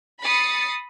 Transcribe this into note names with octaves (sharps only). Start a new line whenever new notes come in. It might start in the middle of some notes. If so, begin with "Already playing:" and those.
B5 D#6 A6 C7 C#7